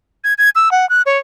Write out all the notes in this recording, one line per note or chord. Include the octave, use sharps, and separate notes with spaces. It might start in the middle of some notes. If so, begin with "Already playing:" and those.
G#6
G#6
E6
F#5
F#6
C#5